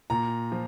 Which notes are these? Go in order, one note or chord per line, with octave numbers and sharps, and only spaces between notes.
A#2 A#5
F3